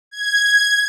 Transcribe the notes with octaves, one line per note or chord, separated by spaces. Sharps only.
G#6